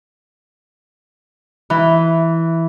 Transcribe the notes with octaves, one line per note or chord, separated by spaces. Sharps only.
E3